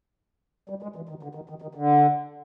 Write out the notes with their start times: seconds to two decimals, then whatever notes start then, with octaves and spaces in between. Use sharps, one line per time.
0.70 G3
0.83 G#3
0.96 E3
1.09 D#3
1.23 D3
1.35 D#3
1.49 D#3
1.62 D#3
1.75 D3